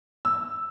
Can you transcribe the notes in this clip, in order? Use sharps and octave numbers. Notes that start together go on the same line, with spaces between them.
E6